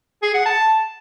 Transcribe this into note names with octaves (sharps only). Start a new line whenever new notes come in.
G#4
F#5
A5